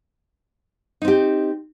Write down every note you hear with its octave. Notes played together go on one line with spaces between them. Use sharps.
C4 D#4 G4